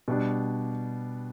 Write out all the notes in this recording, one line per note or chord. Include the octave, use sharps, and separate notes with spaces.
B2 G3 D4